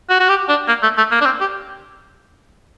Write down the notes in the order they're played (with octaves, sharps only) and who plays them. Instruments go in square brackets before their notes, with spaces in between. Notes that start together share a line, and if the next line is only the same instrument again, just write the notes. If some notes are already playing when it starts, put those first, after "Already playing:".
[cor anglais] F#4
F#4
G4
D4
A#3
A3
A3
A#3
D4
C4
G4